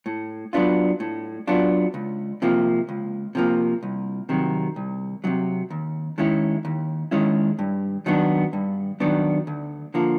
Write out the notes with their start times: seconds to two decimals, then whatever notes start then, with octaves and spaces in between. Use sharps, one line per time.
0.06 A2
0.53 F#3 B3 D4 F4
1.00 A2
1.47 F#3 B3 D4 F4
1.94 C#2
2.42 C3 F3 A#3
2.89 C#2
3.35 C3 F3 A#3
3.83 C2
4.29 C3 D#3 F#3
4.76 C2
5.24 C3 D#3 F#3
5.70 D#2
6.18 D#3 G#3 C#4 E4
6.65 D#2
7.11 D#3 G#3 C#4 E4
7.59 G2
8.06 D#3 F#3 B3 D4
8.53 G2
9.00 D#3 F#3 B3 D4
9.47 D2
9.94 D3 F3 A#3